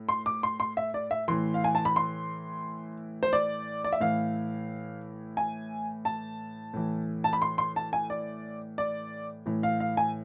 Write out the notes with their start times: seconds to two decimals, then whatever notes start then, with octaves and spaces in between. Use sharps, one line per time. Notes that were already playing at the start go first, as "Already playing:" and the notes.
Already playing: A2
0.09 C6
0.26 D6
0.43 C6
0.60 C6
0.77 E5
0.94 D5
1.11 E5
1.28 A2 E3 C6
1.54 F5
1.64 G#5
1.75 A5
1.85 B5
1.96 C6
3.23 C5
3.33 D5
3.84 D5
3.93 E5
4.00 A2 E3 F5
5.37 G#5
6.05 A5
6.74 A2 E3
7.24 A5
7.33 B5
7.42 C6
7.58 C6
7.76 A5
7.93 G#5
8.10 D5
8.78 D5
9.46 A2 E3
9.63 F5
9.80 F5
9.97 G#5